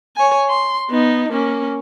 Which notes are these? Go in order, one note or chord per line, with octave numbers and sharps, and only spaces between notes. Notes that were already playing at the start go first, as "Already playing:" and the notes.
C#5 G#5
C6
B3 D#4
A#3 C#4